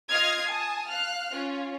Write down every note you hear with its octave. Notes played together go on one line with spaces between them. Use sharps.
F4 D#5 D#6 F6 G#6 C7
G#5 A5 D#6
F5 F6 F#6
C#4 F4